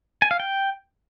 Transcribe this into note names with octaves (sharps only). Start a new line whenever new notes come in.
G#5
F5
G5